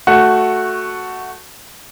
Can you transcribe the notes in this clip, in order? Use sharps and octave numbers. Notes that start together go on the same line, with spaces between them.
A3 F#4